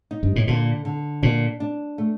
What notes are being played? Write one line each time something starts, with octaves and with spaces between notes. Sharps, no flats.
D#4
G2
A2
A#2 D3
D3
A#2 D4
D4
A3